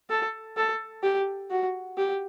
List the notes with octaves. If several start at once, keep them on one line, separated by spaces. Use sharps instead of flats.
A4
A4
G4
F#4
G4